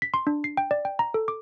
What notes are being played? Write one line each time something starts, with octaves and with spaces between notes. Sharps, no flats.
B6
C6
D4
C7
G5
D5
G5
A#5
A4
D6